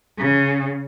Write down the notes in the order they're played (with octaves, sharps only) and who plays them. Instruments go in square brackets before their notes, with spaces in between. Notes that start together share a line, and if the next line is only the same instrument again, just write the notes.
[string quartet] C#3